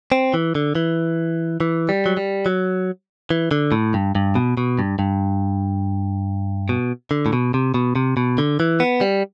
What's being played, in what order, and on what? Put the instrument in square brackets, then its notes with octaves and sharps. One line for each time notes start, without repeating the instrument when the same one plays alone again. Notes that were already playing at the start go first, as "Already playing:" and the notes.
[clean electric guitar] C4
E3
D3
E3
E3
G3
F#3
G3
F#3
E3
D3
A2
G2
G2
B2
B2
G2
G2
B2
D3
A2
B2
C3
B2
C3
B2
D3
E3
B3
G3